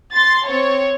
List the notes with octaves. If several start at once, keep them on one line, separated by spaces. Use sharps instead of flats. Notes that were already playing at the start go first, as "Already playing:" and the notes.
C6 A6
C4 C#5